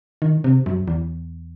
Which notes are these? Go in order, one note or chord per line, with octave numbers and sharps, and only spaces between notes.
D#3
C3
F#2
E2